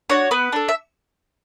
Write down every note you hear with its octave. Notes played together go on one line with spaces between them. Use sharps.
D4 F#4 C#5
B3 B4
D4 A4
E5